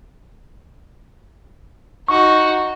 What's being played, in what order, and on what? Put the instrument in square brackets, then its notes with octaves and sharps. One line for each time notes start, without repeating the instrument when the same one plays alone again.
[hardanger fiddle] D#4 F#4 [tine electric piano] C#6